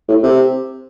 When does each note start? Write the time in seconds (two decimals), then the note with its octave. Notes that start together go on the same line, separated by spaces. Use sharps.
0.08 A2
0.23 C3